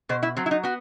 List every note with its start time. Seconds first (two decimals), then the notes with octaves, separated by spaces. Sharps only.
0.09 B2 C5
0.23 E4
0.37 F#3 C4
0.46 E4
0.51 D#4
0.63 B3 F#4